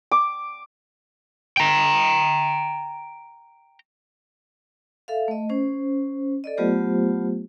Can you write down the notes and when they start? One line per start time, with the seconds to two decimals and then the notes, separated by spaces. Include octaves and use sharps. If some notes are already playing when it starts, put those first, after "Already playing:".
0.12 D6
1.57 G5 A#5
5.08 A4 E5 F5
5.28 A3 D#5
5.49 C#4 C5
6.44 A4 D5 D#5
6.57 F#3 A3 B3 F4 G4 C5